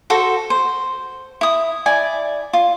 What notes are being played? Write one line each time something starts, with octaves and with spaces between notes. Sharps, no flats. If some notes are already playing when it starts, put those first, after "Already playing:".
F#4 A4 C5
C5
E4 D#6
E4 D5 G#5
F4